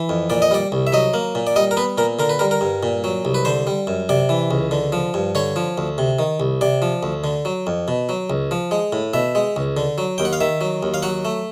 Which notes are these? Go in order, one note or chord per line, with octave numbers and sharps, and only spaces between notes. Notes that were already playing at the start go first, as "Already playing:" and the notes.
Already playing: E3
F2
A#2 D5
D#5
G3 D5
C2
E5
F#3 D#5
A#3
A#2
D5
G3 D#5
A#4
B3 B4
A#2 A#4
D3 A#4
B4
G3 A#4
A#4
G2
A#2
F#3
C2
B4
D3 C5
G3
F#2
C3 D5
E3
C#2
D3
F3
G2
D3 C#5
F3
D2
C3
D#3
C2
C3 D5
F3
D2
D3
F#3
F2
B2
F#3
C#2
F3
G#3
A2
B2 E5
G#3
C#2
D3
F#3
D#2 G5
F#5
F5
D#3 E5
F#3
D#2
F5
F#3 F#5
A3